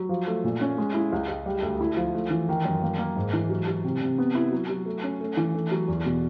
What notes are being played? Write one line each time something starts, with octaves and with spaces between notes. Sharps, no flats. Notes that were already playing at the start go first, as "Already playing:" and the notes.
Already playing: F#3
F3
A3
A#2
C#4
G#3
E4
C#2
C#2
G3
D2
E4
F3
A3
E3
D#3
F#2
A#3
A#3
G#2
E3
F#3
F#3
C3
C3
B3
E4
F#3
F#3
A3
C#4
A3
E3
A3
F#3
E2
B2